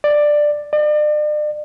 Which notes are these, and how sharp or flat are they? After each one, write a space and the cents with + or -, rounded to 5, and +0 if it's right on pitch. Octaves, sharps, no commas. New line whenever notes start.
D5 +10
D5 +40